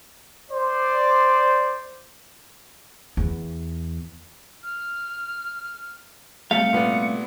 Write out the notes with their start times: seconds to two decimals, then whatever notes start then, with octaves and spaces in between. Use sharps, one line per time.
0.50 C5 D5
3.17 E2
4.63 F6
6.51 C2 G3 A3 F5 C#7
6.73 A#2 B3